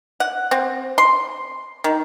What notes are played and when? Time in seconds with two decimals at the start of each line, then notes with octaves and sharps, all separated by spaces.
0.20 F#5
0.51 C4
0.98 C6
1.84 D#3